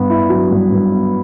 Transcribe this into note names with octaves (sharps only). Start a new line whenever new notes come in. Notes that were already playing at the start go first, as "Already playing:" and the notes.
Already playing: G2 B3
E4
F#3
G2
G2
B3